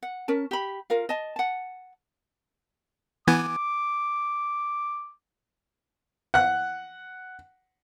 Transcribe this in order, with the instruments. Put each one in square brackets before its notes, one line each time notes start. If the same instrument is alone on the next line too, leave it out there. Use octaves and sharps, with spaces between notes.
[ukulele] F#5
C#4 A#4 A5
G4 B5
F4 A#4 F5
D#5 A5
F#5 A5
[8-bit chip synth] E3 B3 G#5 [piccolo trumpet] D6
[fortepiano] F#5 F#6